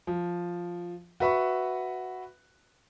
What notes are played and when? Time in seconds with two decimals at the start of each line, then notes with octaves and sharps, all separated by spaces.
0.07 F3
1.20 F#4 B4 E5 B5 C#6